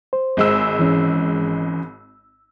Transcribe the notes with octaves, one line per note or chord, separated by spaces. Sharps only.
C5
G#1 G#3 E6
E3 C#4